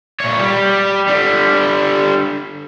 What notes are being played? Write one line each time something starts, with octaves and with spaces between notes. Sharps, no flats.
A#2 C#5
G3 G4
D3 G3